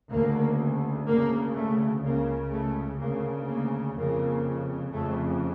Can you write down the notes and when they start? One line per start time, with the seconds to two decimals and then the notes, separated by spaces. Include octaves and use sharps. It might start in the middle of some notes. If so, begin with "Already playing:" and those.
0.11 D2 C#3 A#3
1.07 D2 C#3 A#3
1.55 A3
2.03 C#2 C#3 A#3
2.51 A3
3.00 D2 C#3 A#3
3.48 A#3
3.96 F2 C#3 A#3
4.92 F2 C#3 A3